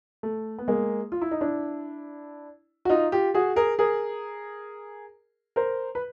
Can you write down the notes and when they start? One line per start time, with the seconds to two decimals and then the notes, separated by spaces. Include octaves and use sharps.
0.23 A3
0.58 B3
0.68 G#3 A#3
1.12 F4
1.21 E4
1.31 D#4
1.41 D4 E4
2.85 F#4
2.90 D#4 F4
3.12 F4 G4
3.34 F#4 G#4
3.56 G#4 A#4
3.79 G#4 A#4
5.56 A#4 C5
5.95 B4